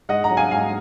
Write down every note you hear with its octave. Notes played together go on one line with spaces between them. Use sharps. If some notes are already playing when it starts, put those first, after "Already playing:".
G#2 D#5 F#5
F#5 A#5
F#3
F5 G#5
G#2 F5 G#5